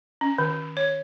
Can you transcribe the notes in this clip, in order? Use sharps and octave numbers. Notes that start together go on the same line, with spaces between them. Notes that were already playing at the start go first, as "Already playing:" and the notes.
C#4
D#3
C#5